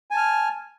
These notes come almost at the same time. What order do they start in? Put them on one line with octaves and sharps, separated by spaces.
G#5 A5 F6